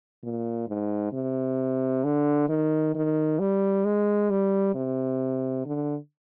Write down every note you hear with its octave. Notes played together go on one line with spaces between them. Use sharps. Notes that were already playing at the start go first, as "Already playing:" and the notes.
A#2
G#2
C3
D3
D#3
D#3
G3
G#3
G3
C3
D3